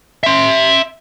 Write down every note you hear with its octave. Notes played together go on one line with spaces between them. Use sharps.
E5 C6